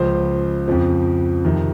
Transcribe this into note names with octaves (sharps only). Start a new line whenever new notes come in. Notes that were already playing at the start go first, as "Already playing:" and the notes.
Already playing: C#2 C#3 F3 C5
F2 C#3 F3
F2 C3 D#3